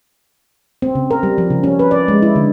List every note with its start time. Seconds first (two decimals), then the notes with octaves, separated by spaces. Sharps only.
0.82 C4
0.95 C#3
1.11 A#4
1.23 G3
1.38 F3
1.50 C#3
1.63 C#4
1.79 B4
1.91 D5
2.08 G#3
2.22 E4
2.36 D3